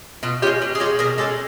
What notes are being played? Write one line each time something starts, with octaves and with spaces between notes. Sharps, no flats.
B2 F4
G#3 C#4 F4 G4
B2
G#4
G#3 C#4 F4 G4
B2 G#4 A#4
G#3 C#4 G4 A4